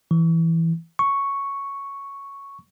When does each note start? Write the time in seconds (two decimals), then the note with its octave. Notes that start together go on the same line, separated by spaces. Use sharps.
0.11 E3
0.99 C#6